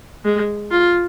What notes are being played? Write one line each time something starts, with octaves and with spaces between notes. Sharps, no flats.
G#3
F4